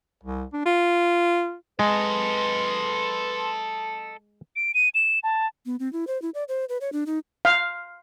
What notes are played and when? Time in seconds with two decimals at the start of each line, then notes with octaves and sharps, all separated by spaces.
0.23 C2
0.53 D4
0.66 F4
1.79 G#3 A4 B4 D#5 C6
4.56 D7
4.74 D#7
4.95 E7
5.23 A5
5.66 B3
5.80 C4
5.93 E4
6.07 C5
6.22 E4
6.34 D5
6.48 C5
6.69 B4
6.81 C#5
6.93 D4
7.06 D#4
7.45 F5